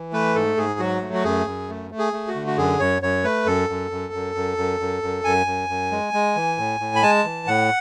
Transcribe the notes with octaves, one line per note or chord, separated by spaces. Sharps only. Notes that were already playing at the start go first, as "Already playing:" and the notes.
Already playing: E3
A3 B4
G#2 A4
G#2 G#4
F#3 F#4
A3
F#4
F#2 G#4
F#2
A3
A3
G#4
A3
F#4
D3
F#4
F#2 G#4
F#2 C#5
F#2 C#5
A3 B4
F#2 A4
F#2
F#2
F#2
F#2
F#2
F#2
F#2
F#2 G#5
F#2
F#2
G#3
G#3
E3
A2
A2
B5
G#3 A5
E3
A2 F#5